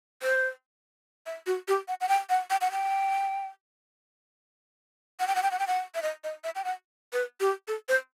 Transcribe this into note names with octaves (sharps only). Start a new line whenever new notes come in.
C5
E5
F#4
G4
F#5
F#5
G5
F#5
G5
F#5
G5
F#5
G5
F#5
G5
F#5
G5
F#5
E5
D#5
D#5
E5
G5
F#5
B4
G4
A4
C5